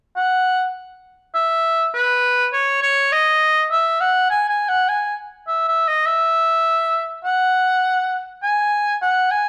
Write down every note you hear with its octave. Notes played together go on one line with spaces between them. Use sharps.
F#5
E5
B4
C#5
C#5
D#5
E5
F#5
G#5
G#5
F#5
G#5
E5
E5
D#5
E5
F#5
G#5
F#5
G#5